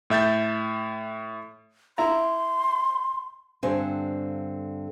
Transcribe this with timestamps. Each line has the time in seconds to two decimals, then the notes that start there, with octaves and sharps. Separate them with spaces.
0.10 A2 E5 G6 A6
1.98 E4 A#5 C6
3.63 G2 D3 C4 A4 C5 G#5